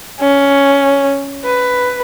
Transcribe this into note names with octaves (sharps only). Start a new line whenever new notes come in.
C#4
B4